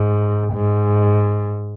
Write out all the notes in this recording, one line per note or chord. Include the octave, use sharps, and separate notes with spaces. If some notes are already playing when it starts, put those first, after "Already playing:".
Already playing: G#2
G#2